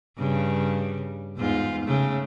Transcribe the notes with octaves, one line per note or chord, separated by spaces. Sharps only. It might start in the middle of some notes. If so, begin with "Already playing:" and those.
G2 C#3
E2 G#2 F4
C#3 A3